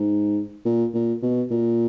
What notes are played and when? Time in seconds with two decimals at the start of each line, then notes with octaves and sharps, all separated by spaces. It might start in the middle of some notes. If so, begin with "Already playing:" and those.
Already playing: G#2
0.66 A#2
0.94 A#2
1.23 B2
1.51 A#2